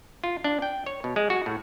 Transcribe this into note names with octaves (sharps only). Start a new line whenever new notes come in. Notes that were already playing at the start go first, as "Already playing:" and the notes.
F4
D4
G5
C#5
B2
G#3
F#4
A2